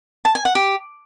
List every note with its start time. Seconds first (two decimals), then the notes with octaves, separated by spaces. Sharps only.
0.25 A5
0.35 G#5
0.45 F#5
0.55 G4